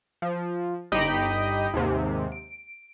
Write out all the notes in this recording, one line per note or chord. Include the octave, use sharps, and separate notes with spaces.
F3
G1 D#4 G4 D#5 G5 B5
D#2 G#2 C3
D7